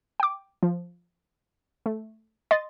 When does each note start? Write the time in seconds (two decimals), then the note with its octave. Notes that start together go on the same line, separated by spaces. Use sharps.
0.20 G5 D6
0.63 F3
1.86 A3
2.51 D#5 C6 A6